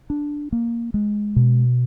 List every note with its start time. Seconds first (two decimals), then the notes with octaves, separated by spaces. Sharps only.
0.10 D4
0.52 A#3
0.94 G#3
1.36 B2